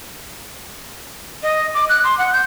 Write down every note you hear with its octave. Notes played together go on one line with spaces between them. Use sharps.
D#5
D6
F#6
C6
F#5
G6